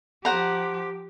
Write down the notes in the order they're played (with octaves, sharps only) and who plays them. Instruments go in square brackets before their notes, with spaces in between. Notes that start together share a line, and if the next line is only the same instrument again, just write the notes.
[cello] F3 G4 [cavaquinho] C5 F#5 A#5